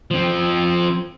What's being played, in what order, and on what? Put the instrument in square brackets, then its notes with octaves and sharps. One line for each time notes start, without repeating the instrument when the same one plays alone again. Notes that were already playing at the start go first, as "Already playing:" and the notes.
[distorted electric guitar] F3 C4